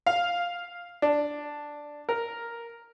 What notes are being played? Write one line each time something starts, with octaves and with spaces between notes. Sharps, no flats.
F5
D4
A#4